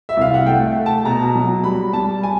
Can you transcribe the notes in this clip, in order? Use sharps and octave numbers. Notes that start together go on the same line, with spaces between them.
E5
C2 F5
F#5
A3 G5
A3
A5
B2 A#5
F#3
G3 B5
G3 A5
G#5